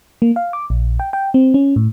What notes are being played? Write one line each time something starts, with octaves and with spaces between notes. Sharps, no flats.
A#3
F5
D6
A#1
G5
G5
C4
C#4
A2